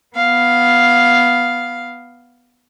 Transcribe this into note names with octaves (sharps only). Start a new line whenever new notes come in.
B3 F5